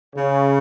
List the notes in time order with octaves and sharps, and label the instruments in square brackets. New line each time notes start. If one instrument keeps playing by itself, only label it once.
[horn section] C#3